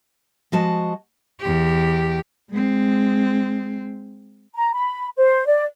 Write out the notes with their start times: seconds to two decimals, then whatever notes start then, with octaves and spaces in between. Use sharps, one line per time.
0.52 F3 G#3 F#4 D#5 A5
1.40 E2 G4
2.50 G#3 C4
4.55 A#5
4.74 B5
5.17 C5
5.47 D5